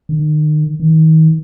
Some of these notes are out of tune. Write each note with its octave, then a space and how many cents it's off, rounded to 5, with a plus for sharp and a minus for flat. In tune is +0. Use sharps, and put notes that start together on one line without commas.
D#3 -35
D#3 +35